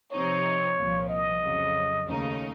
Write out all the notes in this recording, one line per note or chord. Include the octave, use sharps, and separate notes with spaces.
C3 F3 C4 D#4 C#5
C2 A#2 F3
D#5
F2 C#3 F#3
D#2 C#3 A3 D#4